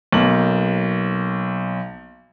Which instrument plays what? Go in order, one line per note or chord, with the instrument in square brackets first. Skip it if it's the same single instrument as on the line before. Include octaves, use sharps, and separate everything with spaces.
[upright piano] B1 A#3 F#7